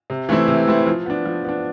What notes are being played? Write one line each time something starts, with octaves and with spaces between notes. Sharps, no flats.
C3
E3 A3 C4 E4
C3
E3 A3 C4 E4
F3
B3 D4
F3
B3 D4